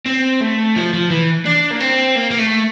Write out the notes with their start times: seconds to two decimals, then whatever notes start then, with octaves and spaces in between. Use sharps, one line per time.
0.06 C4
0.41 A3
0.76 F3
0.93 F3
1.11 E3
1.45 D4
1.71 A#3
1.80 C4
2.15 A#3
2.31 A#3
2.38 A3